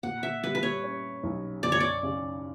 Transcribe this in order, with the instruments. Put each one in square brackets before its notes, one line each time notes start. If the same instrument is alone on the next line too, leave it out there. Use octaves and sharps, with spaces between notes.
[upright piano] A#2 [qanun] F#5
[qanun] E5
[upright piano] G3 [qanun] B4
[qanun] B4
C#5
[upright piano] C#4
B1
[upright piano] F#2 [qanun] D5
[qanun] C#5
D5
[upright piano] C#3